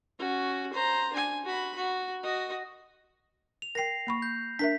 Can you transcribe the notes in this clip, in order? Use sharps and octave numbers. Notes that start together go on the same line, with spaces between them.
C#4 F#4
C5 A#5
D4 G#5
F#4 B5
F#4
F#4 D#5
F7
A#4 G5 A#6 C7
A#3 B5 C#6
G6
D4 A#4 E5 B6